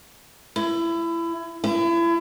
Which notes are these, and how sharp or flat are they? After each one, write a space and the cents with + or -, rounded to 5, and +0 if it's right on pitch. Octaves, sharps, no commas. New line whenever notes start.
E4 +25
E4 +35